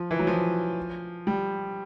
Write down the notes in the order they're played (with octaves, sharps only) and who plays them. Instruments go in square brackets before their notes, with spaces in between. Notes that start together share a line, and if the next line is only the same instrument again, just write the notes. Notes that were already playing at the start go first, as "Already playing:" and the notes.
Already playing: [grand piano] F3
E3
F#3
F3
G3